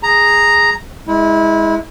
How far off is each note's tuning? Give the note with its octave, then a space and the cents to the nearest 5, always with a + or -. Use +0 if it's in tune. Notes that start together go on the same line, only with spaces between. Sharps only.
G#4 -10 A#5 +0
G#3 +0 E4 -25